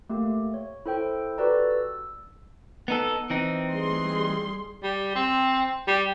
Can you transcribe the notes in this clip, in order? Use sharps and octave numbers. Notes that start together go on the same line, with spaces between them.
A3 A#3 G4
C#5
E4 A4 C5 G5
F#4 G4 A4 B4 D5 A#5
E6
B3 D#4 A4
E3 C4 D#4
G3 G#4 C6
G3
C4
G3